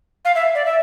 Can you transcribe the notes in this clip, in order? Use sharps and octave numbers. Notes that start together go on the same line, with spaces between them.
F5
E5
D5
E5